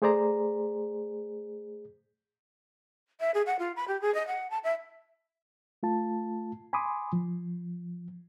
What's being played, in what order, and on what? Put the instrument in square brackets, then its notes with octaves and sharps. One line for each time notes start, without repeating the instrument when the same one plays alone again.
[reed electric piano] A3 G#4 C5 D5 A#5
[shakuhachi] E5
G#4
F#5
F4
B5
G4
G#4
D#5
F#5
A5
E5
[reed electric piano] A3 F4 A5
G#5 B5 C6 D6 D#6
F3